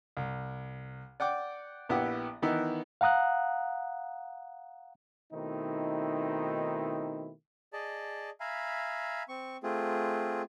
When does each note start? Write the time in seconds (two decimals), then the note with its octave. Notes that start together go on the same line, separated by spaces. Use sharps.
0.17 C2
1.20 D5 F#5 G5 D6
1.89 A#1 B3 E4 G4 B4 F#5
2.42 D#3 E3 B3 D#4 E4
3.01 F5 F#5 A#5 D#6 F#6
5.32 B2 D#3 A3 C4 D#4 E4
7.73 G#4 D5 D#5 A5
8.40 E5 F5 G#5 A#5 B5
9.29 C4 C#6
9.63 A3 C4 F4 G#4